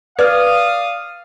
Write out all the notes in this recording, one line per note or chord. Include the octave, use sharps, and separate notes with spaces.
B4 D5 F5 D#6 F6